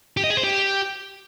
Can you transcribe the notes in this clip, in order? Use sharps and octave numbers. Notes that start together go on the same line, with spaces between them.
G4
D#5
G#4
C5
G4